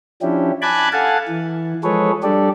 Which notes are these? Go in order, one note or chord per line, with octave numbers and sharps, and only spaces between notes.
F3 C#4 D4 E4 G4
G#5 A5 B5 D6 F#6 G#6
A4 F5 F#5 G#5 A5
E3
F3 G#3 G#4 A4 B4 C#5
G3 D4 G4 A4 D5